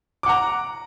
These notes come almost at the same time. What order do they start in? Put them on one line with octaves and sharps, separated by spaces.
D6 F#5 A#5